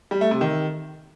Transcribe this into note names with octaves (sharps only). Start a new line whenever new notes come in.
G3
A3
C3
D#3